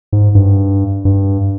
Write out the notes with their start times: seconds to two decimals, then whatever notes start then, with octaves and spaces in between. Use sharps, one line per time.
0.13 G#2
0.35 G2
1.05 G2